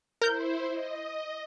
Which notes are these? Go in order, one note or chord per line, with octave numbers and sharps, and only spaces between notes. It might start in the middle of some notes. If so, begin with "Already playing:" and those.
E4 A#4 C5 G6
D#5